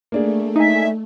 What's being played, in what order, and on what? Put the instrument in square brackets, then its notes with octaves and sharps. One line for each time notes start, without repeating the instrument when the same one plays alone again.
[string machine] A3 [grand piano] A#3 D4 G#4
[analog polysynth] D#4 G#5 [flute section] E5